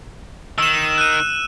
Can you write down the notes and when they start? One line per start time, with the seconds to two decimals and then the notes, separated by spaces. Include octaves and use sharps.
0.58 D#3 E6 E7
0.98 F#6 D#7